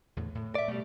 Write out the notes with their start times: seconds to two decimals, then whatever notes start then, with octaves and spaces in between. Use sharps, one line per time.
0.16 E2 A2 D3
0.35 A2
0.55 D5 E5
0.68 B2 G3 A3